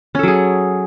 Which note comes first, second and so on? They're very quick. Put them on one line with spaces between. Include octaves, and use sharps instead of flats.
C#4 A4 F#3 G#4